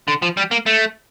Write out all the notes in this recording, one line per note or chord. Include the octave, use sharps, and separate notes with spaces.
D3
F3
G3
A#3
A3